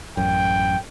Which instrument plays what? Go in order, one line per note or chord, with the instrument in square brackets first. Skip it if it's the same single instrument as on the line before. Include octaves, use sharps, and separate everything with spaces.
[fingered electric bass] A1 F#2 [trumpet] G5